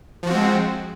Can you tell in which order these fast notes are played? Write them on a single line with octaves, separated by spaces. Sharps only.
F3 F#4 C4 G#3